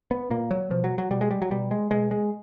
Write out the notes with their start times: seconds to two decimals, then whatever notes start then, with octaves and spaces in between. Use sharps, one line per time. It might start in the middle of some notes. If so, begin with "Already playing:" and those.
0.11 B3
0.30 A#2 A#3
0.51 F#3
0.70 B2 F3
0.84 F#3
0.98 F#3
1.11 B2 G3
1.21 G#3
1.31 G3
1.42 F#3
1.51 B2 G3
1.71 G#3
1.91 B2 G#3
2.11 G#3